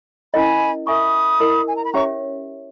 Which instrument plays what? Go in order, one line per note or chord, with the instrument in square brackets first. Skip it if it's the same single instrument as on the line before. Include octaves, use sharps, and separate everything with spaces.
[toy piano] C#4 E4 A#4 D#5 [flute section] G#5 B5
[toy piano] A#4 E5 G#5 C#6 [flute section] B5 D#6
[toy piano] E4 A#4 D#5
[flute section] G#5
A#5
B5
[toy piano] C#4 G4 C#5 E5 [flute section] A#5 C#6